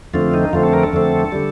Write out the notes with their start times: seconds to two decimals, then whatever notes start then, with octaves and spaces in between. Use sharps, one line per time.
0.14 F2 D3 A3 C4 F4
0.34 D#4
0.53 F2 D3 A3 C4 F4
0.63 A4
0.73 A#4
0.83 A4
0.93 F2 D3 A3 C4
1.32 D3 G3